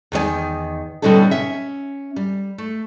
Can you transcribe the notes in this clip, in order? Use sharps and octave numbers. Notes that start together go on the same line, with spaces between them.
E2 D#3 D5 G#5
B2 D3 G3 C#4 D#4 A4
C#4 E5
G3
A3